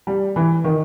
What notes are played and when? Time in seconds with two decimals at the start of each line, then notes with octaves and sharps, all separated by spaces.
0.07 G3
0.36 E3
0.64 D#3